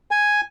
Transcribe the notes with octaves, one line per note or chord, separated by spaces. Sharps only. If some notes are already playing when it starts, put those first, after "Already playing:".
G#5